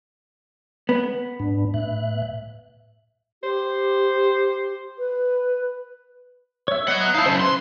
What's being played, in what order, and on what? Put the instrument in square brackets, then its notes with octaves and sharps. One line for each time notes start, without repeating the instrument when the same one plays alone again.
[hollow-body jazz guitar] B3
[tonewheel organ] G#2 D4
A2 E5 F#6
[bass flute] G4 [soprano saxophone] C5
[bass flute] B4
[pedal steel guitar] C#5 E5
[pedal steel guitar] B3 D#5 F#6 [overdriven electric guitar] C#5 F#5
[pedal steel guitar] D#4 E4 [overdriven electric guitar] F5 A5
[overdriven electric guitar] F#2 C#3 [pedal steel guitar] C5
[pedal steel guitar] B4 [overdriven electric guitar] C6